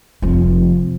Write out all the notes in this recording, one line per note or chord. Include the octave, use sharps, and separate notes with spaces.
F1 F3